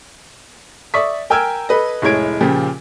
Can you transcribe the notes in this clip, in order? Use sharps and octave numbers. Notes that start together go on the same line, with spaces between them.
D5 E5 C#6 D#6 B6
A#4 G5 G#5 E6 F6 G#6
A4 B4 D#5
F1 A2 G#3 C#5 G#6 D7
A#2 C#3 F3 G4